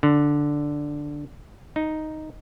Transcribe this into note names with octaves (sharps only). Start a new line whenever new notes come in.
D3
D#4